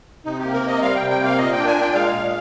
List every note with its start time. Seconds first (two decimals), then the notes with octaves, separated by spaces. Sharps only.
0.25 C3 D#4
0.39 A#3 G4
0.53 A#4
0.62 C3 D#5
0.82 G3 F5
0.96 G5
1.01 C3
1.10 G5
1.20 A#3 F5
1.38 A#2 D#5
1.53 D4 G5
1.67 G#5
1.77 A#2 G5
1.94 G#3 F5
2.13 A#2